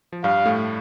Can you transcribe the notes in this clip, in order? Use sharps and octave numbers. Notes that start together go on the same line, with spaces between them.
F3
G2 G3 F5
A2 A3